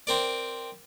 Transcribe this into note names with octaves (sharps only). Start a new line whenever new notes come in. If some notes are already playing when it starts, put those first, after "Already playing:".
C4 A#4 D5